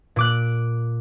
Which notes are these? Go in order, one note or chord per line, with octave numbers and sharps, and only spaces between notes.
A#2 D6 F#6